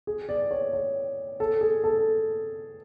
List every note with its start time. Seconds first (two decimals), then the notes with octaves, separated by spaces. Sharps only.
0.07 G#4
0.29 D5
0.51 C#5
0.73 C#5
1.40 A4
1.61 G#4
1.84 A4